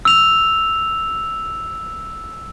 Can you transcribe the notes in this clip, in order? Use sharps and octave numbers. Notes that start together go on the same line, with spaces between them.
E6 F7